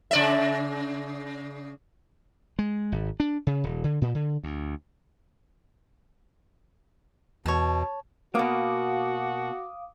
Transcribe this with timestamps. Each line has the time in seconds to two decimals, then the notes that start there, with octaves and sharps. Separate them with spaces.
0.11 C#3 D5 E5
2.59 G#3
2.92 G#1
3.20 D4
3.47 C#3
3.64 D#1
3.84 D3
4.01 A#2
4.15 D3
4.43 D2
7.46 E2 B2 C#5 A5
8.35 B2 A#3 F#4 F5 D6 D#6